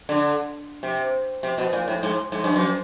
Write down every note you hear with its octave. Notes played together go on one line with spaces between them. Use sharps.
D3
C3
C3
B2
A#2
A2
G#2
G#2
G2
F#2